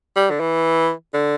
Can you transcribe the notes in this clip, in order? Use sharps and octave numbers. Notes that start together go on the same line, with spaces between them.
G3
D3
E3
D3